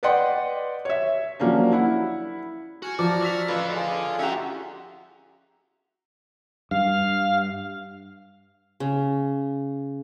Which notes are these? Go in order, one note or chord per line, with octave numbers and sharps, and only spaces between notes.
B4 D5 D#5 F#5 G5 C6
C#5 E5
F3 F#3 A#3 C#4 D4
E4 F#5
F#4 G#5 F6
F3 D5 A#5 D6 F6
F#4 E6 B6 F7
A1 F4 A4 B4 D5
F4 G#4
C#4 F#4 G4 E5 A#5
G2 F5
C#3